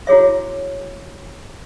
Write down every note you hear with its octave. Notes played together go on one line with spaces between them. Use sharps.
E4 F#4 G#4 C#5 E5